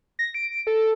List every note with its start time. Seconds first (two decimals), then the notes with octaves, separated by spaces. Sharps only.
0.19 A#6
0.34 D7
0.67 A4